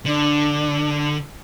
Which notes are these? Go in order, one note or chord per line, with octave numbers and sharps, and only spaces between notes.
D3 D4